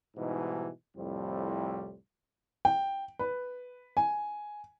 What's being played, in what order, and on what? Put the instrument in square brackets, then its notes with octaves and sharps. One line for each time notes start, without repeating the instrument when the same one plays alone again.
[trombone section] G#2 B2 E3 G3 D#4
C2 F2 A2 G3 C4
[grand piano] G5
B4
G#5